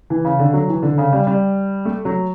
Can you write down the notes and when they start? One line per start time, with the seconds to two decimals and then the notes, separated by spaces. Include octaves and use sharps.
0.10 E3
0.25 C#3
0.39 D3
0.53 F#3
0.68 E3
0.83 D3
0.98 C#3
1.13 G3
1.27 G3
1.85 A3
2.05 F#3